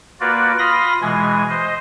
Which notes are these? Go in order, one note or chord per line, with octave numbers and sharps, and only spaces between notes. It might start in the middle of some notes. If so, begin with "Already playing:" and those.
A#3 F4 F#4 B4 D5
F4 F5 B5 C6 D#6 A#6
B2 E3 G#3 G#5
C5 D#5